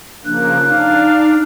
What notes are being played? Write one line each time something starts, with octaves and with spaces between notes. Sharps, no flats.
C#3 F3 A#3 D4 F#6
D4 D#4 F5